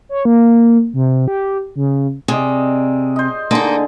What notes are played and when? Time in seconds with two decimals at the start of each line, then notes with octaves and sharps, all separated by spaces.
0.09 C#5
0.25 A#3
0.94 C3
1.28 G4
1.76 C#3
2.28 C3 G#4 D5 D#5
3.16 C5 D#5
3.51 D3 A#3 D#4 G#4 C6